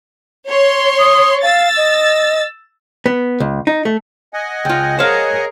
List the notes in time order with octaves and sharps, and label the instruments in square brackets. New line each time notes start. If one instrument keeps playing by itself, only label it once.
[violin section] C#5 C6
[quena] D#6
[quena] F5 [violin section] E6 A6
[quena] D#5
[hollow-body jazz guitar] B3
C#2
D#4
A3
[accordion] D#5 F#5 G#5
[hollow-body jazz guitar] C#2 F4 [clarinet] G5
[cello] G#4 A#4 [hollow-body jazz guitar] C5 F5 [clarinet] C#5